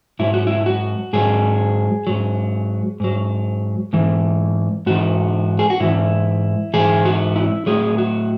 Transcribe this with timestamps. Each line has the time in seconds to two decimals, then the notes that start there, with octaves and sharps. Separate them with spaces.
0.19 G#2 F#3 E4
0.34 F#4
0.47 E4
0.66 F#4
1.13 G#2 F#3 G#4
2.07 G#2 F#3
3.00 G#2 F#3
3.93 G#2 E3
4.86 G#2 E3 F#4
5.59 G#4
5.70 F#4
5.80 G#2 E3 E4
6.74 G#2 E3 G#4
7.05 F#4
7.36 E4
7.66 A2 F#3 G#4
7.98 F#4